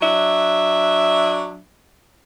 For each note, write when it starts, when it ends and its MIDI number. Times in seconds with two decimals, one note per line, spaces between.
0.01 1.60 54
0.01 1.60 62
0.01 1.60 76